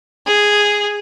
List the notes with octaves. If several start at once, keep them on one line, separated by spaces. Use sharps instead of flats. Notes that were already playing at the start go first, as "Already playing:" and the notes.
G#4